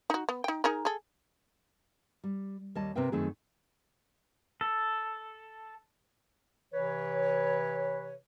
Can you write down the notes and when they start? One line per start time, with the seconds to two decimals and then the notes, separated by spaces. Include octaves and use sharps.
0.10 D#4 F#4
0.29 B3
0.44 D#4 G5
0.64 D#4 G#4 A#4
0.85 G#4 A4
2.24 G3
2.75 D#2 G3 C#5 D#5 A5
2.95 C3 C4 A#4 B4 E5 G5
3.12 F#2 D#3 A3 C4 G#4
4.61 A4
6.74 C3 E3 B4 C#5